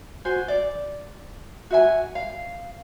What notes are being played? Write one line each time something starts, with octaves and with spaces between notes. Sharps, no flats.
F#4 C5 G#5
D5
F#4 E5 G#5
F5